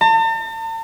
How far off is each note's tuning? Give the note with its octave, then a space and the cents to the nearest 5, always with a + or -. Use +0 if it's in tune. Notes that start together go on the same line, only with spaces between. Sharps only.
A5 +45